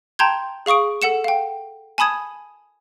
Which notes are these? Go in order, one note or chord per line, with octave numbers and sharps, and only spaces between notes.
G5 A5 A#5 C6 G6 G#6
G#4 F5 C#6 D#6 D7
A4 F#5 C#7 E7
F5 G5
G#5 A5 B5 D#6 G#6